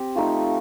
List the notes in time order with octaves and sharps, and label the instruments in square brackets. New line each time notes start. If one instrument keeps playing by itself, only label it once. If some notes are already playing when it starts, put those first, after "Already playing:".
Already playing: [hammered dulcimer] C4 G4
F3 A3 D#4